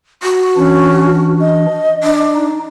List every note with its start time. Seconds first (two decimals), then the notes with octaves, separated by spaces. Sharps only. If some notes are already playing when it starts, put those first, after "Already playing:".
0.23 F#4
0.57 E3 C#4 D4
1.41 D#5
2.03 D4
2.36 D#4